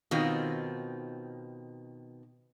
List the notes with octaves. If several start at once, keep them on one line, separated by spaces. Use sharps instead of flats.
B2 D#3 C4 D#4 F4